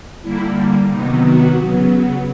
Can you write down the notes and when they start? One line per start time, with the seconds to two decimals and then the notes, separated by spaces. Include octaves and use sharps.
0.21 D3 G3 A#3 E4
0.90 C3 D#3 F#3 B3 D#4
1.23 F#4
1.59 C#3 F#3 B3